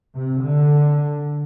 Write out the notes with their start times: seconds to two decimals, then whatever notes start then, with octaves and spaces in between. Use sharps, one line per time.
0.15 C3
0.44 D3